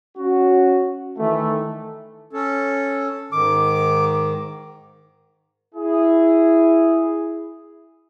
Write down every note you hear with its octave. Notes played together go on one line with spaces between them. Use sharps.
C#4 F#4
D#3 E3 A3
C#4 A4
G#2 D#3 D6
E4 G#4